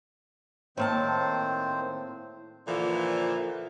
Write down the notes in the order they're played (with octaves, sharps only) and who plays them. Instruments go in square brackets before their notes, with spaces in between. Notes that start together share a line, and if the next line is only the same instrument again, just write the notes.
[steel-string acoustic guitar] A2 A#3 A5 [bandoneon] D#3 C4 C5
[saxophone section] A#2 D3 E3 F3